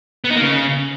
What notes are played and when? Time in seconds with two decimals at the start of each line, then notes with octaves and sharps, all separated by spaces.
0.24 B3
0.30 D#4
0.36 A#3
0.42 C#3